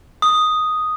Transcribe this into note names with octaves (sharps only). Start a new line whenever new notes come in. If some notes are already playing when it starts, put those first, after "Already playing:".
D#6